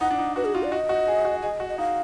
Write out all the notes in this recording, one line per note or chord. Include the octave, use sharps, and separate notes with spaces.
D#4 F#5
D4
D#4
F#4 B4
G#4
F4 F#4
D5
F#4 D#5
F#4
G#4
F#4
G#4 D#5
F#4
D#5
D#4 F5